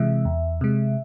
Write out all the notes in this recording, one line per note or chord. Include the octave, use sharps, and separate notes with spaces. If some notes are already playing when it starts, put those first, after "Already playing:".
Already playing: C3 E3 G#3 E5
E2
C3 G#3